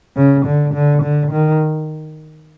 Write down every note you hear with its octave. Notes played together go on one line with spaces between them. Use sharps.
C#3
D3
D3
D3
D#3